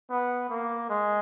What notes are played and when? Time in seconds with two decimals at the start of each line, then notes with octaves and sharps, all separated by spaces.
0.10 B3
0.50 A#3
0.89 G#3